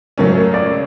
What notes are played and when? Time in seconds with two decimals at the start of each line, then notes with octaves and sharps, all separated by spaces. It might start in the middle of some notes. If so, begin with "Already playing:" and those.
0.18 C#2 C#3 F#3 A3 C#4 A#4
0.37 A#4
0.54 D5